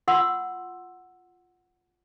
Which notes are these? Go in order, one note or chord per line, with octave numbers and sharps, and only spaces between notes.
F4 F#5 C6 E6